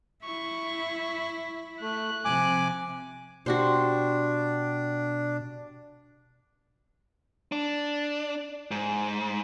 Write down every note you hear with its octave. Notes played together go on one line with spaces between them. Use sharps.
E4 C#6
A3 F#6
C3 F3 G#5 D6
B2 D4 F#4 G4 C5
D4
G#2